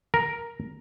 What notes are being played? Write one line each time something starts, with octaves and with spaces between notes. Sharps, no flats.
A#4